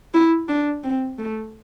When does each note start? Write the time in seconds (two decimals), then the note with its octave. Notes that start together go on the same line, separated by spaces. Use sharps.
0.14 E4
0.48 D4
0.83 C4
1.18 A3